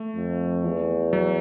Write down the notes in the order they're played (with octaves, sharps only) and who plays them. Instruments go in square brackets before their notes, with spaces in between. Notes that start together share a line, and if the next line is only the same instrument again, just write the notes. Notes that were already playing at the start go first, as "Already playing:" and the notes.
Already playing: [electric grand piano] A3
[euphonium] F2
E2
[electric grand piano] F#3